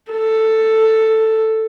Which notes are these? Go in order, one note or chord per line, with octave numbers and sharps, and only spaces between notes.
A4